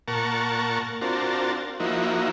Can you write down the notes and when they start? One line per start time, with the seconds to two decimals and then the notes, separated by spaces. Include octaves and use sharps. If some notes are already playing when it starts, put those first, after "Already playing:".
0.08 A#2 A#4 F#5 A5 C#6
1.01 C4 D4 F4 F#4 A#4 A5
1.80 F3 A#3 D#4 E4 F#4